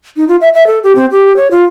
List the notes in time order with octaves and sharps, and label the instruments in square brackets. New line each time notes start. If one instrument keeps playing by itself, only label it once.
[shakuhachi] D#4
F4
E5
E5
A4
G4
C4
G4
C#5
F4